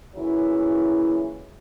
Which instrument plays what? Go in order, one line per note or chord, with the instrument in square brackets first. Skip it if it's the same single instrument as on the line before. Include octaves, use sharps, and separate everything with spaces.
[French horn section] A#2 C#3 E3 F#3 E4